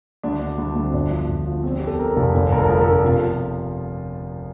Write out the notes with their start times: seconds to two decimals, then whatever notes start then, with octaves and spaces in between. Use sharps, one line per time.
0.23 D2 D4
0.41 D2
0.58 D2
0.76 D2
0.84 C4
0.94 G1 D4
1.11 F3
1.29 G1
1.46 F3
1.64 E2 C4
1.80 E2 G4
1.87 A4
1.99 E2 A#4
2.16 F1 A4
2.34 G1
2.52 G1 A#4
2.57 A4
2.69 F3 A#4
2.81 A4
2.87 G1
2.92 A4
3.04 C3 F4
3.22 F3